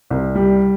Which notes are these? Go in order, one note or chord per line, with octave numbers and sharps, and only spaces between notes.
C2
G3